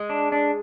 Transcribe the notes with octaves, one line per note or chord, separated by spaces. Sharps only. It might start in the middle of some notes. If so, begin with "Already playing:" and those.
Already playing: G#3
D4
D4